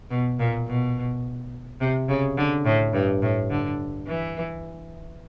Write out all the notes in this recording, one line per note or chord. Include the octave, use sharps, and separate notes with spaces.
B2
A#2
B2
C3
C#3
D3
A2
G2
A2
D3
E3